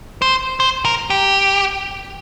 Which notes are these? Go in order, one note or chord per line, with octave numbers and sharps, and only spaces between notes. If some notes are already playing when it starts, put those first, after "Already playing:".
C5
C5
A#4
G4